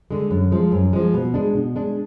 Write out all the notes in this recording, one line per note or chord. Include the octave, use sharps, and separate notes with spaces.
D3 G#3
F#2
F3 G#3
F#2
F3 G#3
B2
G#3 D4
B2
G#3 D4